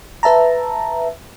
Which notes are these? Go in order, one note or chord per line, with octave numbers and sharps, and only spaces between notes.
B4 E5 A5 A#5